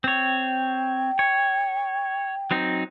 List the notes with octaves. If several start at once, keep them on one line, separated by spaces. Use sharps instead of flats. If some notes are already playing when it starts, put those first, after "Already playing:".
C4 C#5 G5
C#5
F#3 C4 D#4